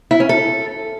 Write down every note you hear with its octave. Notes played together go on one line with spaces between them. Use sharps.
E4
C#4
A4